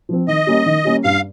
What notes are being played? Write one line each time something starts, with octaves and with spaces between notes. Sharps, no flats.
F3 C4
D#3 D#5
G3 A#3 C#4
D#3
G3 A#3 C#4
G2 F5